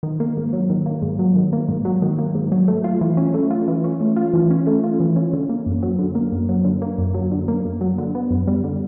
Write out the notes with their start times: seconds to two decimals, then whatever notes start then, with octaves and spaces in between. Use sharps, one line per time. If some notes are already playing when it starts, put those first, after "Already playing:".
0.03 D#3
0.20 A#3
0.37 G#2
0.53 F#3
0.70 D#3
0.86 A#3
1.02 G#2
1.19 F#3
1.36 D#3
1.53 A#3
1.68 G#2
1.85 F#3
2.02 D#3
2.19 A#3
2.35 G#2
2.52 F#3
2.68 A3
2.84 F4
3.01 E3
3.17 C#4
3.34 A3
3.50 F4
3.68 E3
3.84 C#4
4.00 A3
4.16 F4
4.33 E3
4.50 C#4
4.67 A3
4.84 F4
5.00 E3
5.16 C#4
5.33 D3
5.49 A#3
5.66 F#2
5.83 F#3
5.99 D3
6.15 A#3
6.32 F#2
6.49 F#3
6.65 D3
6.82 A#3
6.98 F#2
7.14 F#3
7.32 D3
7.48 A#3
7.65 F#2
7.81 F#3
7.98 D3
8.15 B3
8.31 F#2
8.47 G3
8.64 D3